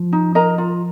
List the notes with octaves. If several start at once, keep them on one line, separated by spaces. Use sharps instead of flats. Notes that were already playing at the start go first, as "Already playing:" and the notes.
Already playing: F3
D#4
A#4 D#5 A#5
F4